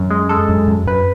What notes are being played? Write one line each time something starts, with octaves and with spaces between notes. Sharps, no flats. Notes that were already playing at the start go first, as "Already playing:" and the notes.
Already playing: F#2
G#3
G#3 A4
F#2
F#2
F#2 B4